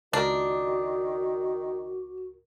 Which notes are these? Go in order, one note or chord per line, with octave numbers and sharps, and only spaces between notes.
C#2 D#3 D4 F#4 A#4